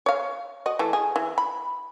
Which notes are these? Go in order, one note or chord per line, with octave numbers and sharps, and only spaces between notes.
C#5 F5
F#4 D#5
E3 A3
G#4
E3
B5